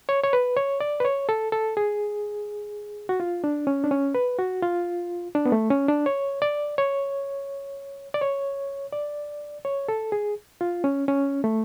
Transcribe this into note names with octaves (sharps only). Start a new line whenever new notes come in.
C#5
C#5
B4
C#5
D5
B4
C#5
A4
A4
G#4
F#4
F4
D4
C#4
D4
C#4
B4
F#4
F4
D4
B3
A3
C#4
D4
C#5
D5
C#5
D5
C#5
D5
C#5
A4
G#4
F4
C#4
C#4
A3